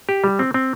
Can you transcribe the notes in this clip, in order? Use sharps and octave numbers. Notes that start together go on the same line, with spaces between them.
G4
G3
C4
C4